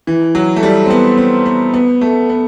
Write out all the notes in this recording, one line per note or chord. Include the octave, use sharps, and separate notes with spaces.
E3
F#3
A3
G3
C4
B3
C4
B3
B3
A3
B3